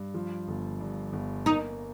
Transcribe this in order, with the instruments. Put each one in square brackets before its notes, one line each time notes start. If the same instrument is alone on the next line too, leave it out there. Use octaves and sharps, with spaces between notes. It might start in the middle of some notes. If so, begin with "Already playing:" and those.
Already playing: [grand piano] G2
F3
G1
G2
G1
[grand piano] A#3 [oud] D#4